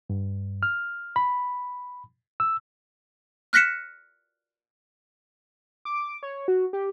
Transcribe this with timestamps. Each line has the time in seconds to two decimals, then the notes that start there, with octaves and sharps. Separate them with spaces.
0.10 G2
0.63 F6
1.16 B5
2.40 E6
3.53 F6 F#6 A#6 B6 C#7 E7
5.85 D6
6.23 C#5
6.48 F#4
6.73 G4